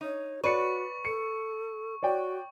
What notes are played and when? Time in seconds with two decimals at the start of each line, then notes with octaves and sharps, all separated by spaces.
0.01 D#4 C#5
0.44 F#4 B4 C#5 D5 C#6 C#7
1.05 A4 C#7
2.03 F#4 C#5 D5 G5